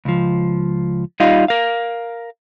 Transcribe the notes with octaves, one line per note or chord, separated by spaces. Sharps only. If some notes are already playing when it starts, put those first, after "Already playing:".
C#2 F3
G3 D#4 F4 D#5 F5
A#4 F5